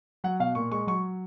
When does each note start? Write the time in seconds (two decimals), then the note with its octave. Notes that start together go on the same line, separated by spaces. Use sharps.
0.24 F#3 F#5
0.40 B2 F5
0.55 A#2 C#6
0.71 G#3 C#6
0.87 F#3 C#6